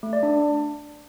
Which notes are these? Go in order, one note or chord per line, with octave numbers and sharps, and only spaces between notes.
A3
D5
D4